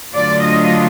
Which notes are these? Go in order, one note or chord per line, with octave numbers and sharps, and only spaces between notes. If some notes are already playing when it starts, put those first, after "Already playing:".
D3 F#3 A3 D4 F4 D5
D#5